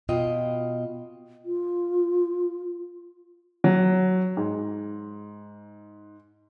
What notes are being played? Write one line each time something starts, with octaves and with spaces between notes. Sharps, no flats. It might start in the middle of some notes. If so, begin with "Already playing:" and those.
B2 F4 D#5 G5
F4
F#3
G#2